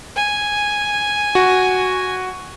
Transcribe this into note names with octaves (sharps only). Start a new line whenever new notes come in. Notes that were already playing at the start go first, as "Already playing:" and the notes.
G#5
F#4